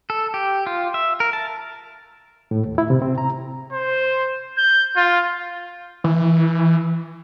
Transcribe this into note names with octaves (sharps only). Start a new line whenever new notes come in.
A4
G4
F4
E5
A#4
A5
A2
D#2
E4
C3
C4
A#5
C5
G6
F4
E3